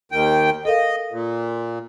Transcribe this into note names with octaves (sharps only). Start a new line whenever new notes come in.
D#2 D#3 G5
A4 A#4 D#5 F5
A#2